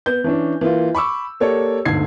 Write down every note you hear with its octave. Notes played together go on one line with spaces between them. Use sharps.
B3 G6
E3 C#4 D4
E3 A#3 F4
B5 C#6 D6 E6
A#3 G4 A4 C#5 D5
G1 D2 G#2 G#6 C7